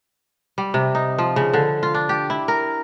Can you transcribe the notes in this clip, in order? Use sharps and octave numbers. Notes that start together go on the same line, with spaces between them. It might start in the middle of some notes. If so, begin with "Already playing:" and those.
G3
C3
D#4
F3
C#3
D3
F4
D4
G4
E4
A#4